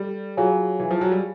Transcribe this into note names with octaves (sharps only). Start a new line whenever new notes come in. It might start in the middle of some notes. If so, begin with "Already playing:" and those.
Already playing: G3 A4 D5
F#3 F4 G#4 C#5 F5 G#5
E3
F3
F#3
G3